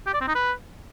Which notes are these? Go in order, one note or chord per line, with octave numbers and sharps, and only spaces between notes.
G4
D5
C4
D#4
B4